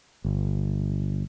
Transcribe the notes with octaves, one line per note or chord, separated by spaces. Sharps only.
G1